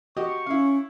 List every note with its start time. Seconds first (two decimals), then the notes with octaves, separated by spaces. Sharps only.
0.17 F#4 G4 D#5 C#6
0.46 C#4 E4 F5